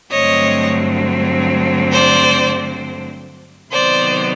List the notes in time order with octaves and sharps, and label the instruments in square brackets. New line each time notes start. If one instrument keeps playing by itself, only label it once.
[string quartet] G2 D3 F#3 A3 C4 C#5 D#5
C5 D5
C3 D#3 F#3 B3 C5 D5